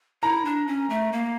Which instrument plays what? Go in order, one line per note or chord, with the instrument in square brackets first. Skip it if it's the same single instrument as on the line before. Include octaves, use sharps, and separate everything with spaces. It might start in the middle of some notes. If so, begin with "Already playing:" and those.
[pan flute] E4 [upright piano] A#5
[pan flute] D4
C#4
A3
A#3